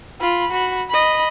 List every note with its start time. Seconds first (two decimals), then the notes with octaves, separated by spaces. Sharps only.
0.21 F4 B5
0.52 F#4 B5
0.89 D#5 B5